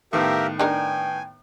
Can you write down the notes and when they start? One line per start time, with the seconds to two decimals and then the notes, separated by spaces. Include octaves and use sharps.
0.13 A2 D#3 B3 G4 A#4 E5 F5
0.59 D4 D#4 A#4 G5 G#5